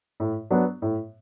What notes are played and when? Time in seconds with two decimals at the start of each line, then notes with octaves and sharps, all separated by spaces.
0.20 A2
0.51 F#3 B3 D4
0.82 A2